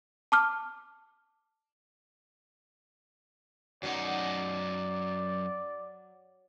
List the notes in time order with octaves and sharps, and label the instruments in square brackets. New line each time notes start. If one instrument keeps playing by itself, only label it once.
[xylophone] A5 D6 F6
[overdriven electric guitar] F#2 D#4 [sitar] F#3 [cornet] D5